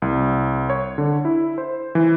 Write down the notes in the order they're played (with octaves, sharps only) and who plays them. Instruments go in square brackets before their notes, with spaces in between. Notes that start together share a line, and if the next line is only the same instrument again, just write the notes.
[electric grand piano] C2
C#5
D3
E4
C5
E3